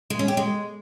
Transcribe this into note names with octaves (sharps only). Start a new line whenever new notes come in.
G#3
C#4
G4
G#3